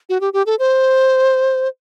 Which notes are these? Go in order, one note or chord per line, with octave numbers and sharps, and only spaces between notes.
F#4
G4
G4
A4
C5